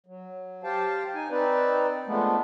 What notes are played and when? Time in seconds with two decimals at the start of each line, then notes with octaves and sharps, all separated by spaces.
0.06 F#3
0.63 G4 C5 F5 G5 A5
1.14 D#4 G#5
1.30 C4 D#4 B4 D5
2.07 F3 G#3 A3 B3 D4